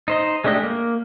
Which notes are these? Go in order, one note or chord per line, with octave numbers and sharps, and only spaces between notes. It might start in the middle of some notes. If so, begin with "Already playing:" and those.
D#4 C5 D#5
G#3 A3 D4 G4 D#5
A#3